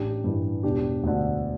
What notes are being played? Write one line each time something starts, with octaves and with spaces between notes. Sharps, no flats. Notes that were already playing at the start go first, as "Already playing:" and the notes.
Already playing: A1 D4 G4
G2 E3
E1 D4 G4
D2 D3